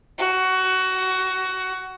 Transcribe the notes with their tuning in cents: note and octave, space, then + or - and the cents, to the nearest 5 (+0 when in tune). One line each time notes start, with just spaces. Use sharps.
F#4 +15